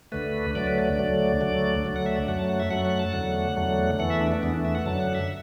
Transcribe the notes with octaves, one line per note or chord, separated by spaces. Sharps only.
D2 D3 A3 B4
D2 D3 F#3 A3 D5
B4
D5
D2 D3 F#3 A3
D2 D3 F#3 A3
D2 D3 F#3 A3
F#5
E5
D5
F#2 F#3 A3 F#5
A5
F#5
E5
F#2 F#3 A3 F#5
F#5
A5
E2 D3 F#3 A3 F#5
E2 D3 F#3 A3
E2 E3 A3 F#5
E5
D4
D4
E2 E3 A3 B3
D4
E5
F#5
F#2 D3 F#3 A5
F#5
E5